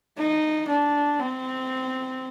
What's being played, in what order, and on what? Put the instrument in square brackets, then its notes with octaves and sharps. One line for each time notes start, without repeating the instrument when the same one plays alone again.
[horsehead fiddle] D#4
D4
C4